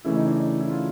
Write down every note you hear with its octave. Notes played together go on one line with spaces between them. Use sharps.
C#3 E3 A3 E4
D#4
D4
D#4
E4
F4